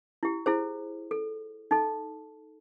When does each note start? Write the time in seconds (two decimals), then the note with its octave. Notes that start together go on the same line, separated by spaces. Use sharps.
0.23 E4 G4
0.46 E4 G#4 C5
1.11 A4
1.71 D#4 A4